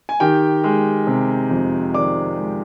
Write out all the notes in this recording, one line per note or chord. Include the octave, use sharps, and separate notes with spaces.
G#5
D#3 G4 G5
G#3
C3
F2
D#3 D5 D6
G#3